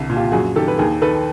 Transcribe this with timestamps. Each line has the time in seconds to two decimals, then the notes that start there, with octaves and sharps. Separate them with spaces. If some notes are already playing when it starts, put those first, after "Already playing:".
Already playing: C2 D3
0.10 A#2
0.16 F4 G4
0.32 F#2 F#4 G#4
0.56 D#3 G4 A4
0.68 B4
0.78 D#2 G#4 A#4
1.02 D#3 A4 B4